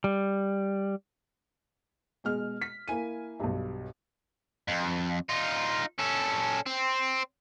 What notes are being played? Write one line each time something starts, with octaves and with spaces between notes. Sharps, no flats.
G3
B2 G#3 F6
B6
A#3 E4 G#5 D#7
B1 G2
F2
D#4 F4
C#4 A4
C4